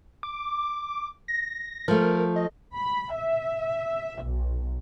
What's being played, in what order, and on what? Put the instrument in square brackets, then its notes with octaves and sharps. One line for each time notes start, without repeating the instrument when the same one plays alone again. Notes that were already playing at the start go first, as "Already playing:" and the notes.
[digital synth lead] D6
A#6
[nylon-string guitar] F3 A3 [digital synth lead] A#4
[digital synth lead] D#5
[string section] B5
E5
B1